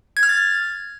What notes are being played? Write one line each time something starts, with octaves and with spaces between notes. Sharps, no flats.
G#6
F6
A6